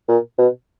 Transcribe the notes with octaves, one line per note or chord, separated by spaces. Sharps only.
A#2
B2